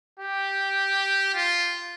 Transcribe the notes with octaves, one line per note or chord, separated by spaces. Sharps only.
G4
F4